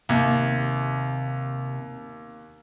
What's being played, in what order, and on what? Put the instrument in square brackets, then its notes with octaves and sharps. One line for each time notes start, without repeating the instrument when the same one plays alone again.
[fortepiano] D#2 [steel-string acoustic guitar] C3